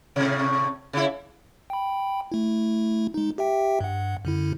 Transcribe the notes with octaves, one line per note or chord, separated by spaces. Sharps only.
A2 C3
C#3 E4
G5 B5
A3 E4
G#3 D#4
G4 E5 G5
G2 F#5
F#2 D3 E4